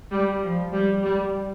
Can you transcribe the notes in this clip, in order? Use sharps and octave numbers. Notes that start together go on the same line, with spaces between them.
G3
F3
G3
G3